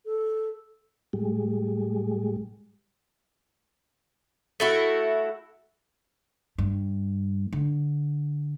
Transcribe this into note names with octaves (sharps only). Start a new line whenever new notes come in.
A4
A2 G3 G#3
A3 E4 F#4
G2
D3